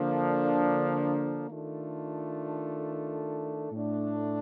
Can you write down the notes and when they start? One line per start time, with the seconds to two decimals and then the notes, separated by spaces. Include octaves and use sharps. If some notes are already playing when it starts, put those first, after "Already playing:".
Already playing: D3 F3 A#3 D4
1.49 D#3 A3 D4 F4 A4
3.72 A2 A3 D4